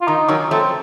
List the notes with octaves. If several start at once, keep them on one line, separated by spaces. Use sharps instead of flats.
F4
D#3 D#4
D#3 F#3 C#4
F3 A3 C4